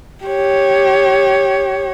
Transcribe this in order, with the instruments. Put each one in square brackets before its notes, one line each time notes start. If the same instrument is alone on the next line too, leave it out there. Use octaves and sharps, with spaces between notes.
[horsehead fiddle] G4 C#5